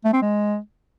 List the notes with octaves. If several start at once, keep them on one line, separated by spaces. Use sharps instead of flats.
A3
C4
G#3